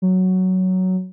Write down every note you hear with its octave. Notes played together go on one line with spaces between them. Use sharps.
F#3